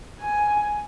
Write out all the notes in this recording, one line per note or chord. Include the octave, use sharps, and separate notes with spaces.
G#5